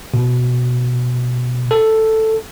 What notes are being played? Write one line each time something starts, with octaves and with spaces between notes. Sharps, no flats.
B2
A4